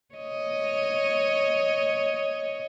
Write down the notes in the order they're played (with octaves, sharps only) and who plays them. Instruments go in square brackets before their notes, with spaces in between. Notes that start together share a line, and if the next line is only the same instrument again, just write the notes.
[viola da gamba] C#5 D#5